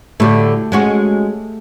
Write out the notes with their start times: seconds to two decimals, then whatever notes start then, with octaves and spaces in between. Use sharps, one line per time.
0.20 A2 D3 A3 G4
0.72 G#3 C#4 F#4